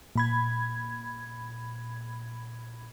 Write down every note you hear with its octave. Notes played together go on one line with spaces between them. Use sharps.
A#2 B5 G#6